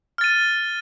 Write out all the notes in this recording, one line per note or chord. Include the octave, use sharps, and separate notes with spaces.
F6 A6 D#7